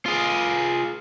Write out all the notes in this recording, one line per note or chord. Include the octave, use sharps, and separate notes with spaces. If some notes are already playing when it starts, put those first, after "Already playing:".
F4 G#4